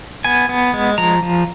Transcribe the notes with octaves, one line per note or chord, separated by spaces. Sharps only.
B3 G#5
B3
G#3
F3 A#5
F3